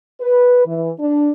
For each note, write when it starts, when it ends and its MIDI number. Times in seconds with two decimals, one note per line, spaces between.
0.21 0.63 71
0.66 0.91 52
0.99 1.30 62